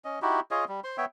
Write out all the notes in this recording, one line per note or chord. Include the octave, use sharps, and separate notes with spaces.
C#4 D#5
D#4 E4 F#4 G4
F4 G#4 C#5 D#5
G3
C5 C6
B3 C#5 E5 G5